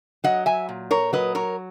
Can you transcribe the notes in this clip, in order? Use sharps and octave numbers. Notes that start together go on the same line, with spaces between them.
F#3 D#5 F#5
E5 G#5
A#2
A#4 C#5
F#3 B4 D#5
A#4 C#5